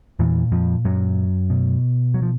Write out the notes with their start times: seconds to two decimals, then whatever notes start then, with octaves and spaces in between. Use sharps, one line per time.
0.19 E2 A#2 E3
0.52 F2 F3
0.85 F#2 F#3
1.50 B2
2.14 F#3
2.22 F3